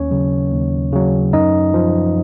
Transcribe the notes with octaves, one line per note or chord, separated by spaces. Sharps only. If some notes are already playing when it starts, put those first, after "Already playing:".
Already playing: D#2 C#4 C#5
C#3 F#3
D#2
C#3 F#3
F#2 D#4 D#5
F3